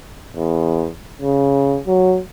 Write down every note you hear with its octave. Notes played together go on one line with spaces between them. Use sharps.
E2
C#3
F#3